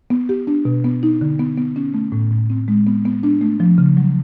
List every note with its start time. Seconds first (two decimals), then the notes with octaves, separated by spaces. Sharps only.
0.10 B3
0.29 G4
0.47 D4
0.65 B2
0.85 B3
1.03 D#4
1.21 D3
1.39 B3
1.58 B3
1.76 C#4
1.94 A3
2.12 A2
2.31 A2
2.50 C4
2.68 G#3
2.87 B3
3.05 B3
3.23 D4
3.41 A3
3.60 F3
3.78 C#3
3.97 F#3